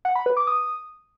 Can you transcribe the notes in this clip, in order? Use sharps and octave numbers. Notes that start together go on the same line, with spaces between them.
F#5
B5
B4
D6
D#6